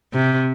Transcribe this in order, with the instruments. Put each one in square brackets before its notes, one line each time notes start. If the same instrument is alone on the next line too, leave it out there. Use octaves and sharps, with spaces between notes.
[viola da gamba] C3